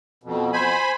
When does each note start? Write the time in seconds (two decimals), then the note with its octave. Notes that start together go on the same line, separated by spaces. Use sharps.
0.23 F2 B2
0.53 C5 G#5 B5